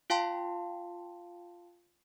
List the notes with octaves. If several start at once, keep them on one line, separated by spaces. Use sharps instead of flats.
F4 F5 G5 A5 C6